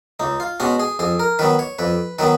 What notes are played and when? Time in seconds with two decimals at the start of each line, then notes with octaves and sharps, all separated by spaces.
0.20 C#2 D#4
0.40 F4
0.60 B2 G#3 C#4 F#4
0.80 G#4
0.99 F2 G#4
1.20 A#4
1.39 D#3 F#3 B3 B4
1.59 C#5
1.79 F2 B4
2.19 D#3 F#3 B3 B4